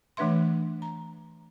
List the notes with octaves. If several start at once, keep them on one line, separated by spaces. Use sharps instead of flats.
E3 A3 D4 B4 E5 C6
A#5